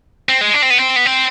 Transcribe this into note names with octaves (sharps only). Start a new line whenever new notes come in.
C4
G#3
D4
C4
B3
C4
B3
C4